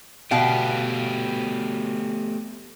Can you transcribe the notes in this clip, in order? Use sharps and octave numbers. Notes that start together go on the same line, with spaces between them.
B2 A3 B3 G4 F5 G5